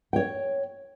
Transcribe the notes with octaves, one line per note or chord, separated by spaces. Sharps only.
C#5 G5